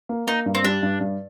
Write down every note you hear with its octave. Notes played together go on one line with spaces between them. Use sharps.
A#3
A#3 D#4
G2
C4
G3 D4
G2
G2